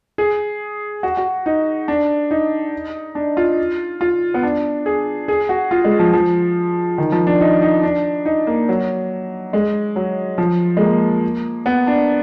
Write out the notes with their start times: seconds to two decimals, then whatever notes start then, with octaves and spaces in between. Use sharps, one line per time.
0.18 G#4
1.03 F#4
1.17 F#4
1.46 D#4
1.88 D4
2.31 D#4
3.15 D4
3.37 F4
4.01 F4
4.34 B3
4.43 D4
4.86 G#4
5.28 G#4
5.49 F#4
5.71 F4
5.85 G#3
5.99 F3
6.13 F3
6.98 D#3
7.12 F3
7.27 D4
7.41 D#4
7.62 D#4
7.83 D4
8.25 D#4
8.47 A#3
8.69 F#3
9.53 G#3
9.96 F#3
10.38 F3
10.77 G#3
10.81 A#3
11.66 B3
11.87 D4